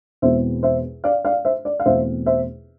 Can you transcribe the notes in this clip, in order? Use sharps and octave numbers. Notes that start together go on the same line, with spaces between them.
E2 B2 G#3 C4 C5 E5
C5 E5
D5 F5
D5 F5
C5 E5
D5
F5
E2 B2 A3 C4 C5 E5
C5 E5